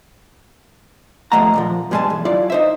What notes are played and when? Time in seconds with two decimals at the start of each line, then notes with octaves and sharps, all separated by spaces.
1.32 C3 F3 G#3 A3 F#5 A#5
1.54 A#2 E3 F3
1.91 G2 G3 G#3 A4 G#5 A5
2.10 B1 E2
2.25 F#3 E4 F4 D5
2.50 D#4 C5 E5